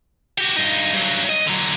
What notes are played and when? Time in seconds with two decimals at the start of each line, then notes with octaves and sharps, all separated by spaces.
0.38 F#4 G4
0.57 G2 D#4
0.93 G2 F#3
1.30 D#5
1.46 D3 F#3